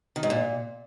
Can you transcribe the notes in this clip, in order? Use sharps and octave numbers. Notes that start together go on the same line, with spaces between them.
D#3
G#2
A#2